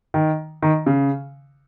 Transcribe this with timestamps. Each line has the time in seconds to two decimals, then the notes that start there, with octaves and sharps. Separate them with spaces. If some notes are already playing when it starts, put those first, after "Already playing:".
0.14 D#3
0.62 D#3
0.86 C#3